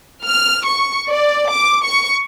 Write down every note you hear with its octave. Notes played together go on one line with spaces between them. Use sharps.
F6
C#6
D5
D6
C#6